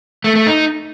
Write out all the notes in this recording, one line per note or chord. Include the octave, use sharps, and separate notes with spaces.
A3
A3
D#4